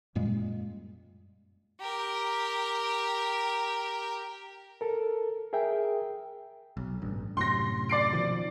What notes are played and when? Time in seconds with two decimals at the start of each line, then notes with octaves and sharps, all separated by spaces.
0.15 F#2 A#2 G3 G#3
1.81 G4 A#4
4.81 A4 A#4
5.53 G#4 A#4 E5 G5
6.77 B1
7.02 A1 G2
7.37 F#2 A2 C3 C6 A#6
7.89 D5 C7 D7
8.13 B2 D#3 F3